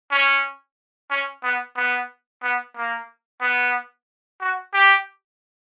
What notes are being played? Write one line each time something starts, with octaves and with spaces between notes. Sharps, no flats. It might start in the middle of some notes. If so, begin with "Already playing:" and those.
C#4
C#4
B3
B3
B3
A#3
B3
F#4
G4